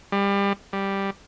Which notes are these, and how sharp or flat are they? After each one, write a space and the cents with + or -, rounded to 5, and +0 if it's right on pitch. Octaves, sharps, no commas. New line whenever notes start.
G3 +25
G3 +0